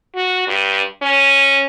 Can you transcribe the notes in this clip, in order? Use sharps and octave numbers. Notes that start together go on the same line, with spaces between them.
F#4
G2
C#4